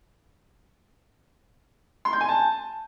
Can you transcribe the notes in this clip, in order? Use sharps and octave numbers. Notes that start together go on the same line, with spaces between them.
C6
G6
G#5
A5